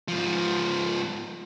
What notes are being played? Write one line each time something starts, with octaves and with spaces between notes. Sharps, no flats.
G#2 F3